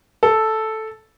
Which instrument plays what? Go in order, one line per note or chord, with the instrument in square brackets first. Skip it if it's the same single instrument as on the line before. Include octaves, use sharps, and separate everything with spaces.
[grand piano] A4